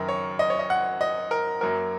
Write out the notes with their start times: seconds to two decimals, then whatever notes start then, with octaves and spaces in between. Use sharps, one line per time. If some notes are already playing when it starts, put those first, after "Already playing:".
Already playing: F#1 F#2 D#3 A#4
0.08 C#5
0.39 D#5
0.50 C#5
0.59 D#5
0.70 F#5
1.01 D#5
1.31 A#4
1.61 F#2 F#3 A#3 A#4